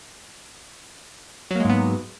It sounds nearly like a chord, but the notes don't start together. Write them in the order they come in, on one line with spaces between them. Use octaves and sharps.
F#3 A#3 G#3 G#2 B3